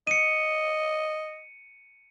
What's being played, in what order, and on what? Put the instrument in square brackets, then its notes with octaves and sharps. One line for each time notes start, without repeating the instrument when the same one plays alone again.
[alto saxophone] D#5 [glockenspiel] C#7 D#7